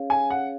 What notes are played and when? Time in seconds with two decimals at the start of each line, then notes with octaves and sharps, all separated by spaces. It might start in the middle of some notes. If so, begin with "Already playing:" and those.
Already playing: C#4 G#4 C#5 F5
0.10 G#5
0.30 F#5